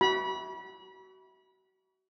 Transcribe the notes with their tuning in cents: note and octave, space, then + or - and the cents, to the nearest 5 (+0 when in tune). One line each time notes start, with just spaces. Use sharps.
F#4 +35 B5 -25